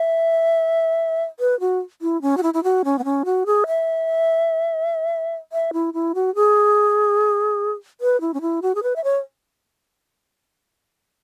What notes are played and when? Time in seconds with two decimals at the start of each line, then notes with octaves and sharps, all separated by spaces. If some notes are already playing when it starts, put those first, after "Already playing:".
Already playing: E5
1.40 B4
1.60 F#4
2.02 E4
2.22 C#4
2.37 F#4
2.43 E4
2.54 E4
2.63 F#4
2.84 C#4
2.98 B3
3.04 C#4
3.25 F#4
3.46 G#4
3.67 E5
5.52 E5
5.73 E4
5.94 E4
6.15 F#4
6.35 G#4
8.01 B4
8.21 E4
8.34 C#4
8.41 E4
8.62 F#4
8.75 G#4
8.83 B4
8.96 E5
9.04 C#5